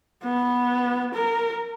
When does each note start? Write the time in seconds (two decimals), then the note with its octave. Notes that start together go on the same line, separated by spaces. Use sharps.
0.24 B3
1.15 A#4